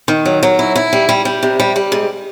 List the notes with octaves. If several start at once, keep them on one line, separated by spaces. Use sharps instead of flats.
D#3
F#3
F#3
E4
E4
G3
G3
G3
C3
G3
G3
G#2